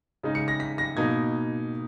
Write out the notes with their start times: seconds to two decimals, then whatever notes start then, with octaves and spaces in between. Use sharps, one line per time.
0.23 C#3 G#3 D#4
0.35 C#7
0.48 A#6
0.60 B6
0.78 A#6
0.97 B2 A#3 D#4 G#6